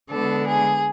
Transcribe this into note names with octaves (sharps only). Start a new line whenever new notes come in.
D3 G#3 B3 D4 A4
G#4